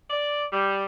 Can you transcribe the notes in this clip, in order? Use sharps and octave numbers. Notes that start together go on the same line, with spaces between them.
D5
G3